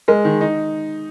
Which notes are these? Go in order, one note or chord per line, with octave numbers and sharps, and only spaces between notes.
G#3 A#4
D#3
D#4